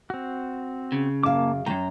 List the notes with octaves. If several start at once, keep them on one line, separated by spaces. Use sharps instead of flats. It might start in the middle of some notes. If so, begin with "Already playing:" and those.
C4 F#4
C#3
F#2 A#3 F5 A5 D6
C2 F#2 G5 A#5